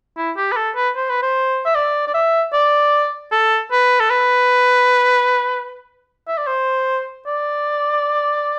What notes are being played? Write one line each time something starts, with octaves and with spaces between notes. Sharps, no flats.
E4
G4
B4
A4
B4
C5
B4
C5
E5
D5
D5
E5
D5
A4
B4
A4
B4
E5
D5
C5
D5